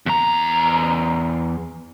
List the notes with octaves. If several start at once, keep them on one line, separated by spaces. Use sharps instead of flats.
E2 A#5